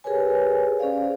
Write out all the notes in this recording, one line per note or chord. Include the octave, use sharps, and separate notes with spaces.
G4 G#4 A#4 B4 C#5 G#5
C#4 G#4 C5 D5 F5